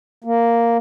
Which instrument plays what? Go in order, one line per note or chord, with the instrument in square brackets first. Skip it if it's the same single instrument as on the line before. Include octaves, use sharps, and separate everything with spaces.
[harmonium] A#3